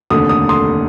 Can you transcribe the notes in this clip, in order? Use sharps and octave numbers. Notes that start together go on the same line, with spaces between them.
F1 D#2 D3 D#6
D#6
C6 D#6